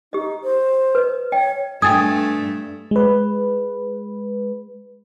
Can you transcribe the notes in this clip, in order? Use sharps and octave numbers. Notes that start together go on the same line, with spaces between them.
D#4 G4 D#5
C5
B4 D#5
C#5 D#5 G5
G2 A3 G5 G#5 D#6 G#6 A6
G#3 B4